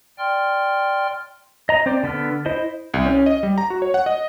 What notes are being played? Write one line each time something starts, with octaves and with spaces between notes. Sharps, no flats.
D5 G5 C6 F6
D#5 A#5
C4 C5 D5
D3 B3 A4 F6
E4 C5 D#5
C2
C#4
D#5
G3
A#5
F#4
C#5
F#5
D#5